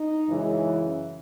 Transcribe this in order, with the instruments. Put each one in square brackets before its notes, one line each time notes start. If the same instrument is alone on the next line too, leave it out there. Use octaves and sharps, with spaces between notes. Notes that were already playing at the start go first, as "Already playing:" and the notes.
Already playing: [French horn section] D#4
F#2 C#3 E3 G#3 C#4